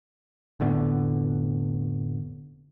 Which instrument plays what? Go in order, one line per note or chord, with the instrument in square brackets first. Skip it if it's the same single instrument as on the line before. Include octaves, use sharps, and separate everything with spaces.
[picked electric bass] F1 A2 D3 B3